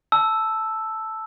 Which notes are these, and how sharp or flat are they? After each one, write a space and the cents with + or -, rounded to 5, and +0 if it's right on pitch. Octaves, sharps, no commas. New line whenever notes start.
A5 +0 E6 +0